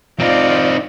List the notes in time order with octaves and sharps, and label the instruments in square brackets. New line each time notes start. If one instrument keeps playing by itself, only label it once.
[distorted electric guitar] C4 D#4 [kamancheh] F4 D5